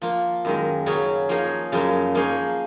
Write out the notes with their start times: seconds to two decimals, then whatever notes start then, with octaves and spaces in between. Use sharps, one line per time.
0.02 F3 A#3 F4
0.45 F#2 D#3 G#3
0.86 C#3 F#3 C#4 G#4 C#5
1.29 F3 A#3 D#4 G#4 C#5
1.72 F#2 C#3 F3
2.14 F3 A#3 D#4 G#4 C#5